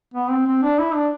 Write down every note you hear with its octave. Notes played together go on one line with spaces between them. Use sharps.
B3
C4
C4
D4
E4
D4